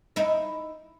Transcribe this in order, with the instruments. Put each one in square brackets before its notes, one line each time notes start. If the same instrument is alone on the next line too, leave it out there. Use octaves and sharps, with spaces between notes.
[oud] D#4 E4